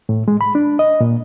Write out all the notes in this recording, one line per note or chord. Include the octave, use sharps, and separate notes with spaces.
A2
G#3
B5
D4
D#5
A#2